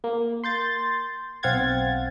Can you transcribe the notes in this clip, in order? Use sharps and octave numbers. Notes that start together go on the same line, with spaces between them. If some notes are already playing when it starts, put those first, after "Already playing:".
A#3
C6 G6 A6
B1 C4 F5 F#5 G#6 A6